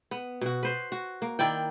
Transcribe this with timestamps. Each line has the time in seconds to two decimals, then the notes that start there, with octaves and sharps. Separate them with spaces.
0.11 B3
0.41 B2 F#4
0.63 B4 C5
0.92 F#4
1.22 A#3
1.39 D#3 E4 D5 G5